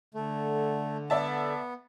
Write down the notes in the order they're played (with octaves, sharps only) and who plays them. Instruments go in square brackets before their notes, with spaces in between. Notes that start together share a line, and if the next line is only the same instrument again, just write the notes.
[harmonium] D3 [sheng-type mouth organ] A3
[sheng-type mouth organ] B3 [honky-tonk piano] D5 E5 A5